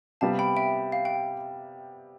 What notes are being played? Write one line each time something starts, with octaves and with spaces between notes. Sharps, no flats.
C3 G3 B3 F5 A5
G5 B5
E5 G5
F5
G5